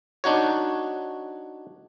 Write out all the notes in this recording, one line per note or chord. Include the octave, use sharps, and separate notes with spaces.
D4 D#4 F#4 C#5